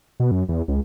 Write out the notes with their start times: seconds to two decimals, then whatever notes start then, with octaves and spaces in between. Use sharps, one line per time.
0.20 B2
0.31 F#2
0.49 E2
0.68 C#2